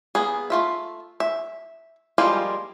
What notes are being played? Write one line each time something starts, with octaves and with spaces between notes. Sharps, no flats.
A#3 B3 G#4
A3 F4 E5
E5
F3 G3 G#3 A#3 F4